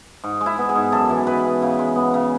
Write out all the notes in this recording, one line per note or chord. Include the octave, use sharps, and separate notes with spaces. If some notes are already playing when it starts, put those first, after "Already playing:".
G#2
G#3
E4
B3
G#4
G#2
F#2 A4
E3
G#3 B4
B3
C#3
G#3
B3
C#3